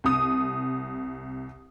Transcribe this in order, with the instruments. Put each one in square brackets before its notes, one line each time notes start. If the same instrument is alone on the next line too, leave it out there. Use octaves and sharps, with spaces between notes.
[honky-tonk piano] C2 D#6